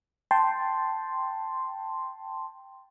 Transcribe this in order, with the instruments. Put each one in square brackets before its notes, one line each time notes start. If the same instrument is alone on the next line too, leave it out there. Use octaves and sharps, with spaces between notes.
[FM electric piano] G5 A5 C6